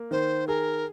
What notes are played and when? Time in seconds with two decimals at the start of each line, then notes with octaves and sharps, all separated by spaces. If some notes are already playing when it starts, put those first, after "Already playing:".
Already playing: A#3
0.11 D#3 C5
0.47 G#4 A#4